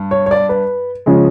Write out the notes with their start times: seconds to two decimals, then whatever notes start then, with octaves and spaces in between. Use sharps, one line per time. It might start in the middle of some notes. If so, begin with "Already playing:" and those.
Already playing: G2
0.11 C#5
0.26 C#5
0.31 D5
0.49 B4
1.06 C#3 F3 G#3 C#4